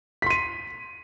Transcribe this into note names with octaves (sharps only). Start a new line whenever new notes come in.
C6 B6 D#7